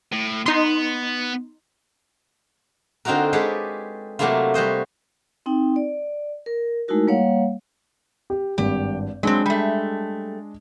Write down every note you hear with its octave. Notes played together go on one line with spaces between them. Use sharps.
A2
B3 D#4 C6
D3 C4 D#4 F4 F#4 A#4
G#3 G4 A4 B4 C#5 D5
C3 F#3 A3 A#3 E4 F4
G3 F#4 C5 D#5
C4 D#4 G5
D5
A#4
G#3 A3 D#4 E4 F#4 A#4
G3 A#3 C#5 F5 F#5
G4
G#1 G2 G4
F#3 G#3 C4 D4
G3 A3